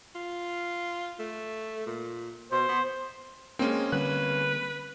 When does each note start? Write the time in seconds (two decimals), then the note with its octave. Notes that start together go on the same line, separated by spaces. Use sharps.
0.15 F4
1.19 A3
1.87 A#2
2.52 B2 C5
2.69 B3
3.59 G#3 A#3 C4 C#4
3.92 D3 G3 C4 B4 F#6